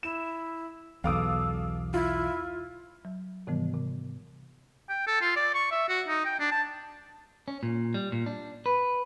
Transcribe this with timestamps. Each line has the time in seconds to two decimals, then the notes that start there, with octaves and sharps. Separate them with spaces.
0.03 E4 E7
1.04 B1 E2 A4 F5 D6 D#6
1.94 E4 F4
3.05 F#3
3.47 G#2 C3 D#3 E3 G3 B3
3.74 C3
4.89 G5
5.07 A4
5.21 F4
5.36 D5
5.54 C#6
5.72 E5
5.89 F#4
6.08 D#4
6.25 G5
6.40 D4
6.52 A5
7.48 C#4
7.63 A#2
7.94 G3
8.12 A#2
8.26 D4
8.66 B4